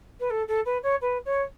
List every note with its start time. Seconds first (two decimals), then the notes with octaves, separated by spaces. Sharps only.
0.20 B4
0.30 A4
0.48 A4
0.65 B4
0.83 C#5
1.01 B4
1.25 C#5